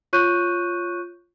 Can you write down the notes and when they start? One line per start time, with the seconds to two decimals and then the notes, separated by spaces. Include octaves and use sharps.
0.13 F4 C#5 C#6 F#6 G6 D#7